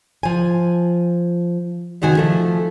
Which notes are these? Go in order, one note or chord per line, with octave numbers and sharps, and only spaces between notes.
F3 G#5
F#2 C3 D#3 F#4 F#5 G#5
F3 A3